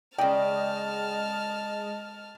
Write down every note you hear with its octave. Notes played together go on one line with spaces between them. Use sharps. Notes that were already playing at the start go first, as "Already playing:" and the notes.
C#3 G#3 D5 D#5 G5 A5 F6